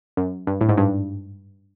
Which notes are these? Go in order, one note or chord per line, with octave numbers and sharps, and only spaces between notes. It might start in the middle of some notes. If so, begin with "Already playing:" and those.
F#2
G2
A2
G#2
G2